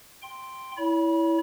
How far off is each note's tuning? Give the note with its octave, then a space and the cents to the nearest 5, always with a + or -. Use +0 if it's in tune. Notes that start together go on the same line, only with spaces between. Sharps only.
G5 +0 C6 +0
E4 +0 C#5 +35 B5 -35